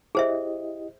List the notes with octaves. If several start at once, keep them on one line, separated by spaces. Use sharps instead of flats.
E4 G4 G#4 C5 D#5 E5